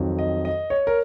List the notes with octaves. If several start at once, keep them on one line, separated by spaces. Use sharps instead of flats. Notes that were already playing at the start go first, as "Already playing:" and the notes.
Already playing: F2 D#3 F#3
D#5
D#5
C#5
A#4